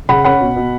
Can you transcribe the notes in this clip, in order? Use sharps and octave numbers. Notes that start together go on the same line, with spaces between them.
C#3 F#5 B5
C#4 F#5 B5
B2
B2